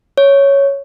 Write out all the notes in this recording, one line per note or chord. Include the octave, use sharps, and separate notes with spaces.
C#5